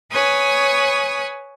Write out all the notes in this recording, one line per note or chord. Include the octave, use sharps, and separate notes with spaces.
B4 C#5 G#5 D#6